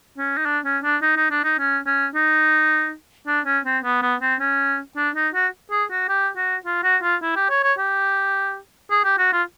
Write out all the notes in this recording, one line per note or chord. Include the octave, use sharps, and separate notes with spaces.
C#4
D#4
D4
C#4
D4
D#4
D#4
D4
D#4
C#4
C#4
D#4
D4
C#4
C4
B3
B3
C4
C#4
D4
D#4
F#4
G#4
F#4
G4
F#4
F4
F#4
F4
E4
G4
C#5
C#5
G4
G#4
G4
F#4
F4